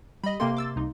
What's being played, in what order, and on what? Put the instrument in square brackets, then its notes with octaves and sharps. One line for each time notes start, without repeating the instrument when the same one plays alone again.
[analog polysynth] G3 [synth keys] D#5 B5
[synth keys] C3 A#3 C6 [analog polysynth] A4 G5
[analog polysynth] D6 E6 A6
C2 D#4